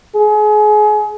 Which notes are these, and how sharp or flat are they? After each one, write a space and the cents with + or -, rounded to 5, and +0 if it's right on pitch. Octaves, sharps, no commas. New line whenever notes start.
G#4 +30